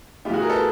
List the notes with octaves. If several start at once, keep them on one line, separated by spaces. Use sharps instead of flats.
A2 E3 F4 F#4 G4 G#4
G#4 A#4
A4 B4